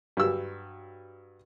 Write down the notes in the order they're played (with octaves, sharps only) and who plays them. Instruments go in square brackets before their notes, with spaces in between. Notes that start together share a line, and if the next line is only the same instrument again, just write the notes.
[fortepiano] G2 F#3 E6